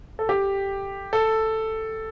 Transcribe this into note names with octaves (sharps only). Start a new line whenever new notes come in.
A4
G4
A4